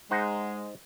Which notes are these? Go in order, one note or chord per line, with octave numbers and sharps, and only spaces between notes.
G#3 D#4 C5 F#5